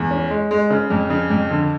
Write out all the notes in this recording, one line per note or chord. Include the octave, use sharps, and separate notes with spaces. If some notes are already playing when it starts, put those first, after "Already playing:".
Already playing: E2
C#4
G#3
G#3
C#3
F2
C#3
F2
D3